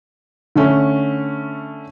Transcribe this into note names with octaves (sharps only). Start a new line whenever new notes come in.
D3 A3 C#4